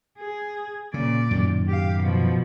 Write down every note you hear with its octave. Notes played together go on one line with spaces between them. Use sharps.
G#4
A#2 C#3 D5
F#2 A2 D#3
G4 F5
B2 F3